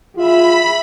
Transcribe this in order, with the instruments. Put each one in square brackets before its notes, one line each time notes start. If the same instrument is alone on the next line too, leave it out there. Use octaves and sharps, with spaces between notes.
[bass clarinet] F4 [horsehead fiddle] G#4 E5 [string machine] B5